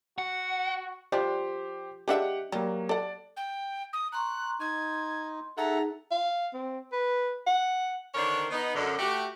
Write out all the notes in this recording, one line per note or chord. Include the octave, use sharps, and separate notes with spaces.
F#4 F#5
F3 G3 D4 G4 C5
G#3 D4 G4 E5 F#5
F#3 G3 A#3
A4 D5 F#5
G5
D#6
A#5 C6 C#6 F#6
D#4 C6 G#6
D#4 G#4 A4 E5 F#5 A#5
F5
C4
B4
F#5
D3 D#3 D4 A#4 C5 C#5
B3 D#4
F#2 D3
A3 F#4 G4